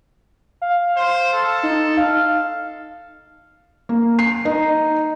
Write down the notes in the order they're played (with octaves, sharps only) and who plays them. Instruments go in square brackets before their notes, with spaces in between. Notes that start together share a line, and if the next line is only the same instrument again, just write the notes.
[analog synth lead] F5
[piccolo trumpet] C5
A4
[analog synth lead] D#4
F5
[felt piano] A#3
C7
D#4